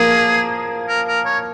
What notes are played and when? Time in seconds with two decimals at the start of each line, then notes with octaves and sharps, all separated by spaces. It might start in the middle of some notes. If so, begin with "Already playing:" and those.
Already playing: F3 A#3 G#4
0.89 A#4
1.08 A#4
1.26 C#5